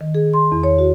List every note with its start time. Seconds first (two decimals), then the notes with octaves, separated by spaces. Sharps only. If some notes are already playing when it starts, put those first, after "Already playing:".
0.01 D#3
0.15 G#4
0.34 C6
0.52 E2
0.64 C#5
0.79 F#4